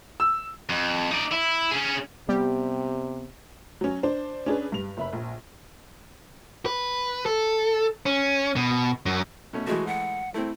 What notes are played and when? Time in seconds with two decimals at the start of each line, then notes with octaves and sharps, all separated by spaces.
0.20 E6
0.69 F2
1.11 D#4 D5
1.32 E4
1.71 C#4 G#4
2.29 C3 G3 B3 G4
3.81 F#3 C#4
4.03 D4 C5
4.46 C#4 D4 G#4 B4
4.72 G2 F7
4.97 F#1 E5 B5
5.13 A#1
6.66 B4
7.26 A4
8.06 C#4
8.56 B2
9.06 F#2
9.53 B2 A3 C#4
9.67 E3 G#3 A3 F#4
9.87 F#5
10.34 A3 C4 E4